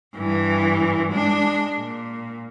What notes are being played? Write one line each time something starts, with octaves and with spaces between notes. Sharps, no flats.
G2 E3
G#3 D4
A#2